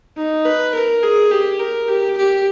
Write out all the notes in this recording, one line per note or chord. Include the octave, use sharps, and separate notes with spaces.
D#4
B4
A#4
G#4
G4
A#4
G4
G4